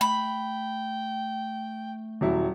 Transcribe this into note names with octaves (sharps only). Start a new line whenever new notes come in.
A3 G5 B5
D#1 F#3 E4